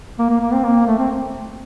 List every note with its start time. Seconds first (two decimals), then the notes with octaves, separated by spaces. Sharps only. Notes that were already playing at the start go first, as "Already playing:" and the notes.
0.19 A#3
0.30 A#3
0.41 A#3
0.52 C4
0.64 A#3
0.86 A3
0.99 C4